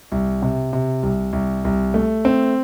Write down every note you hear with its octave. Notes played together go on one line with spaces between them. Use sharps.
C2
C3
C3
C2
C2
C2
A3
C4